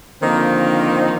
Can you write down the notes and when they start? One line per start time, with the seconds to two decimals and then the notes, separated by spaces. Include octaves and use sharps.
0.21 D3 D#3 F3 A#3 C4 D#4